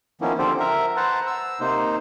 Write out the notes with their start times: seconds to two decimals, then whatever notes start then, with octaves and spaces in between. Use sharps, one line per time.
0.21 D#3 F3 A#3 B3 C#4 E4
0.38 D3 F3 C4 G4 A4 C5
0.60 A#4 E5 A#5
0.97 B4 C5 F#5 A5 A#5
1.27 E6
1.60 C3 A#3 D#4 C5